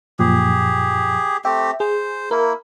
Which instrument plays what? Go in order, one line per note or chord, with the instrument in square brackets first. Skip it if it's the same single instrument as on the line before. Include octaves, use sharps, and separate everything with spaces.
[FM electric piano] F#2 A#2 F3 [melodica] G4 G#4
[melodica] A3 C4 G4 [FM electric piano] E5 G5
[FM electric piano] G#4 [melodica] C5
[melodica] A#3 E4 [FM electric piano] A#4